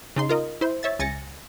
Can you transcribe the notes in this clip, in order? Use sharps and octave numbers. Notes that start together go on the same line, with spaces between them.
C#3 D#4 C6
F4 A#4 D#5
E4 C5
C#5 E5 A6
C#2 G#5 A6 A#6 C#7